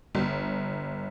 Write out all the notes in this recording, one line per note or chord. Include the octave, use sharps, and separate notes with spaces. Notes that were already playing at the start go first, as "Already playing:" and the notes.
G1